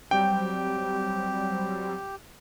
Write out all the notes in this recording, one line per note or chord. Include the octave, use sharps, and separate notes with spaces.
F#3 G3 C4 G4 G5